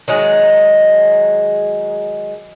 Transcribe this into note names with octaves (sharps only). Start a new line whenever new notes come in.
D#3 F#3 G#3